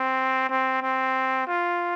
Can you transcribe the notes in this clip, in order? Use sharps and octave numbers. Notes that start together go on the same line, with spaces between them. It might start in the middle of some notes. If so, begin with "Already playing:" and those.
Already playing: C4
C4
C4
F4